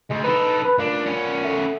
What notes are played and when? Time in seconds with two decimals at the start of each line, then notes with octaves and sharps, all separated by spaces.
0.10 D2 G#3
0.24 D#4 A4 B4
0.65 B4
0.79 D2 A#2 D4
1.06 B3 C#4
1.44 A3